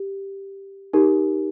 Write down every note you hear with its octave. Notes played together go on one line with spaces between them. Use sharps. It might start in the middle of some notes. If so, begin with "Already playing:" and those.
Already playing: G4
D#4 G4 A#4